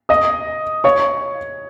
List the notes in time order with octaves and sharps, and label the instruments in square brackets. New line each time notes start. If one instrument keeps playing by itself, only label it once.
[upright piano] D#5 D#6
C#5 C#6